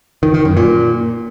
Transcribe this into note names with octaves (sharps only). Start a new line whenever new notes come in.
D#3
D#3
F#2
A#2